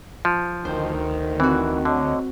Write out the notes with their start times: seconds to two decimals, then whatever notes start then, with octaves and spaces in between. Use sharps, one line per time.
0.25 F3
0.65 D2 D#3 C5
1.40 E3 C4 F#4
1.85 D3 D4 C#5 D#5